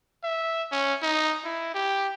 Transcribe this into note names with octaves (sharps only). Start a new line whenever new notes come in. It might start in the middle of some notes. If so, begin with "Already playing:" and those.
E5
C#4
D#4
E4
G4